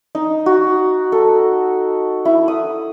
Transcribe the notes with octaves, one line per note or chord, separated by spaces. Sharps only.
D#4
F#4
A4
E4
D#6